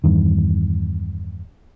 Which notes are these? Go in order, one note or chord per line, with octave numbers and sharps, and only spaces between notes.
E2 G2 D#3